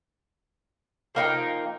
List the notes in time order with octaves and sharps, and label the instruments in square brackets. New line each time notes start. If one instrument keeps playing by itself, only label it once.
[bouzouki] F3 A#3 D#4 G5